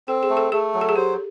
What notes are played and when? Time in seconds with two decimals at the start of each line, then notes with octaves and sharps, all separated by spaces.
0.08 C4 A4
0.23 G#4
0.30 A3
0.37 A4
0.52 A3 G#4
0.74 F#3
0.81 A4
0.89 G#4
0.96 G4 C5